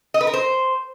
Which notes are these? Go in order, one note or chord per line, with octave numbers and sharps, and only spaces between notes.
D#5
B4
A#4
C5